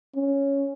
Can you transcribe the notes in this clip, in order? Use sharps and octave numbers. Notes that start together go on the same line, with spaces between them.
C#4